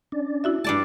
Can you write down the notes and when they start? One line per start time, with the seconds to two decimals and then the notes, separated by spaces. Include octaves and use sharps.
0.12 C#4 D4 D5
0.44 E4 F#4 E5
0.64 G2 G#3 D5 A5